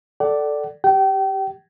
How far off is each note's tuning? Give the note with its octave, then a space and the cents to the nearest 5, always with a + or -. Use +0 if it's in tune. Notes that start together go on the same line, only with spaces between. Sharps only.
A4 +0 D5 +0 F#5 +40
G4 +0 G5 -30